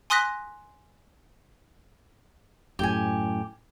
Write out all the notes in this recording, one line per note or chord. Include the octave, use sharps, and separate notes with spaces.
G#5 C6 D#6 F#6 A#6 B6
F#2 A2 G4 G#5